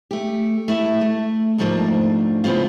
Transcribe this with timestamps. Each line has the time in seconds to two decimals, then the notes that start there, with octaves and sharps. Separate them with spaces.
0.11 A3 G4
0.68 A3 E4 E5
1.01 A3
1.58 D2 G#2 F3 A3 A#3 D4
2.44 A2 C#3 B3 C4 F4